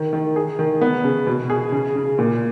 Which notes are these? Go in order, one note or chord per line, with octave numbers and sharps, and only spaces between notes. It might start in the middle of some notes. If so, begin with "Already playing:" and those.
Already playing: D#3
D#3
G#4
D#3
B3
C#3
B2
G#4
C#3
C#3
A#2